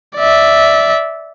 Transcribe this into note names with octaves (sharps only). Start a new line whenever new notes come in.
D5 E5